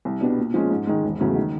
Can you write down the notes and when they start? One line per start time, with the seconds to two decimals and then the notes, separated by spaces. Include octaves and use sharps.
0.05 C2
0.21 B2 G3 B3 D4
0.38 A#2
0.54 F3 G#3 C#4
0.70 G#2
0.87 D#3 G#3
1.03 E1
1.20 E2 C#3 F#3 A3
1.36 D#3